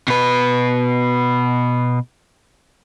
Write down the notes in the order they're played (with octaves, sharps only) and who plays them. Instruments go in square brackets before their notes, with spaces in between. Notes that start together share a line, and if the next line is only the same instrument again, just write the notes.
[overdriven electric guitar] B2 B4